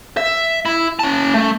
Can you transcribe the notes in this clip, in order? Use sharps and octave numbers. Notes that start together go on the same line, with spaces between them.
E5
E4
C#4 A5
A3